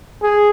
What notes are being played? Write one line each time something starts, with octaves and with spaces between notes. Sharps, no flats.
G#4